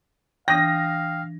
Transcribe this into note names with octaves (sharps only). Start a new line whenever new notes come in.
E3 D4 F5 G5 D#6 A#6